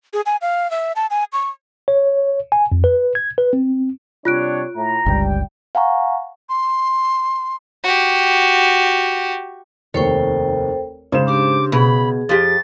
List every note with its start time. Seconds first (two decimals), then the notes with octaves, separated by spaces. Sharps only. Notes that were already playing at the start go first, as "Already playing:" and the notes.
0.13 G#4
0.26 G#5
0.41 F5
0.71 E5
0.96 A5
1.10 G#5
1.33 C#6
1.88 C#5
2.52 G#5
2.72 F2
2.84 B4
3.15 G#6
3.38 B4
3.53 C4
4.25 C3 G3 D4 F4 C#5 F#6 D7
4.75 A2 A#5
5.06 G1 C#2 G3 G5
5.75 F5 F#5 G#5 A#5 C#6
6.49 C6
7.84 F#4 G4
9.94 F1 D#2 A4 C5 C#5 G5
11.12 G#2 C#3 C5 E7
11.27 D4 G4 C6 D6
11.72 B2 G#4 B5
12.29 F2 G4 A6